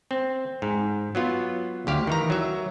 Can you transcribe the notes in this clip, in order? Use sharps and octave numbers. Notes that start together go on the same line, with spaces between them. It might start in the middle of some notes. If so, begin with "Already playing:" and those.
C4
G#2
F#3 B3 F4
D2 G4 F5
D#3 E3 A#5
F#3 E5